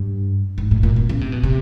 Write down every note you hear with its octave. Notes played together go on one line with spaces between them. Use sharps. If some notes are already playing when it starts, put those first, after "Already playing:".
Already playing: G2
G#2
A2
A#2
B2
C#3
C3
B2
C3